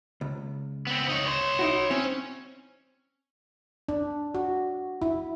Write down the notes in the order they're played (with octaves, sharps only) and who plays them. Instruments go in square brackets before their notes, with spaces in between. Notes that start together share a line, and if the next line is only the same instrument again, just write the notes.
[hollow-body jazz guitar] C#2
[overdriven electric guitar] B3 C4
D#4 C#5
C#5 C6
[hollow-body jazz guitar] D#4 E4 F#4
[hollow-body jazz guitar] C4 [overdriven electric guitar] C#4
[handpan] D4
F#4
E4